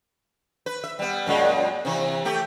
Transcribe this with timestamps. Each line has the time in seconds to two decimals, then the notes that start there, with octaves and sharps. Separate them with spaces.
0.66 B4
0.84 E5
0.99 G3 B3
1.26 F#2 A#2 G#3
1.85 C3 E3
2.25 A3 G4